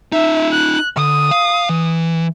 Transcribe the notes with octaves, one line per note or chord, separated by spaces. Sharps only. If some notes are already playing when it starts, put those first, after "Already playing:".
D#4 F4 E5
F#6
D3 D#6
F5
E3